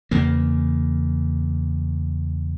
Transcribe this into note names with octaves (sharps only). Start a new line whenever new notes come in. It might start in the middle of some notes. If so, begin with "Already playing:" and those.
E2 C#3 A#3